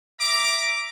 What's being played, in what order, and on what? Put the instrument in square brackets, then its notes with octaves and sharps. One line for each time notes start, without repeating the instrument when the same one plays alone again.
[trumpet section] E5 A#5 D6